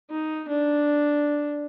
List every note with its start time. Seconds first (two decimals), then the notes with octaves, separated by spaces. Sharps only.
0.10 D#4
0.48 D4